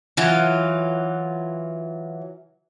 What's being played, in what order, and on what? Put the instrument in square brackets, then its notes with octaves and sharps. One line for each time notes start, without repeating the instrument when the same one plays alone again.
[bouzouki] E3 F#3 F4